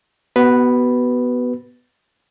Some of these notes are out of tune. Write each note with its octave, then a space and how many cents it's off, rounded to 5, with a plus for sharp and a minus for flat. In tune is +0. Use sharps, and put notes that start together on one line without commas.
B3 +0 F#4 +35 B4 +0